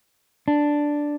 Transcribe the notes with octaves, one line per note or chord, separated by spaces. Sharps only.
D4